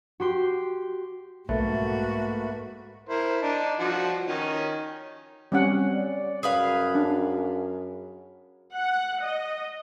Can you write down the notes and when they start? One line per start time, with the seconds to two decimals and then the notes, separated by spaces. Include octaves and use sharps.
0.20 F#4 G4 C6
1.49 B1 G#2 A3 A#3 F#4 B4
3.09 E4 A#4 C5
3.42 D4 D#4 A5
3.79 F3 F#4
4.28 D#3 C#4 D#4
5.52 G3 C4 C#4 F#5
5.93 D5
6.43 F#2 G#4 B4 F5
6.95 D4
8.74 F#5
9.22 D#5